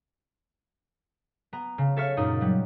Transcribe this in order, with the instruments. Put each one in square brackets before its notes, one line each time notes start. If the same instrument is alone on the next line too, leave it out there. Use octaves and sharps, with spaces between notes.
[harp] B3 A#5
C#3
A4 C#5 E5 F5 C#6 F6
F#2 A#2 D#4 D#6
F#3 G3